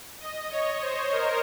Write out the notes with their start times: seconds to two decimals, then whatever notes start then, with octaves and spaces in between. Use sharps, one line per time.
0.20 D#5
0.50 C#5
0.82 C5
1.12 A#4